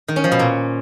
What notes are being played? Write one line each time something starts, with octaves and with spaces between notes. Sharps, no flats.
D#3
C#4
F3
B2
A#2